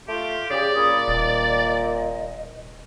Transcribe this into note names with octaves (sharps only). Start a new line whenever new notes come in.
A3 F4 G4 C6
C#3 G4 G#4 D5
A#2 C#4 B5 D#6
D#1 D#5